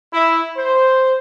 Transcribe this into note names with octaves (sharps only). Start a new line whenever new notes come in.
E4
C5